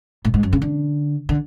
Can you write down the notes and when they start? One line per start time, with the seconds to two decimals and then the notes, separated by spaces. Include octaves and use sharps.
0.25 A2
0.34 G#2
0.43 F#2
0.53 C#3
0.62 D3
1.29 D3